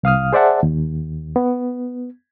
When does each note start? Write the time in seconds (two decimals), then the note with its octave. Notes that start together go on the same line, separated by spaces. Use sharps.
0.03 C2 F5 D#6 F6
0.33 G#4 C5 D5 E5 F#5 A5
0.63 D#2
1.36 B3